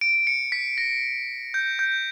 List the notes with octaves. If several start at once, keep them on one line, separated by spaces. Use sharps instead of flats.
D7
C#7
B6
A#6
G6
G6